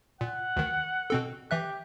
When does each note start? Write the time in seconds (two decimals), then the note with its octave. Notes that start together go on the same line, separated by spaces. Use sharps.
0.21 A#2 F#5
0.57 D2 D#3
1.10 B2 C4 A4
1.51 E3 G4 E5 F#6